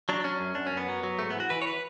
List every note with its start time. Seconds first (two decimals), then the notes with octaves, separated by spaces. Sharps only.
0.09 F#3 D4
0.24 F#3 C#4
0.40 F#2
0.55 F#2 D4
0.67 C#4
0.72 F#2 B3
0.88 F#3
1.03 F#3
1.19 G#2 A3
1.30 B3
1.35 E3 F#4
1.50 E3 B4
1.62 C#5
1.67 B4